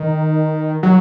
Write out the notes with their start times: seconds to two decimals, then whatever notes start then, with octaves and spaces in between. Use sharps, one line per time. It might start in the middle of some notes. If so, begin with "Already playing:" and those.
Already playing: D#3
0.83 F#3